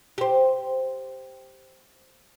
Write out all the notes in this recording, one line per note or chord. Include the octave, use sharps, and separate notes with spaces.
G4 C5